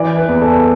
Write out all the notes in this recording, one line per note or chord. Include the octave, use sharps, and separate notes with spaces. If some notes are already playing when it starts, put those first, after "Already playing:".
Already playing: E3 D5
B4
E2
A4